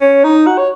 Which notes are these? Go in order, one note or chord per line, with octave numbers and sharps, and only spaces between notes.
C#4
D#4
F#4
C#5